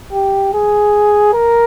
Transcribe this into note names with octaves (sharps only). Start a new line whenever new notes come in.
G4
G#4
A#4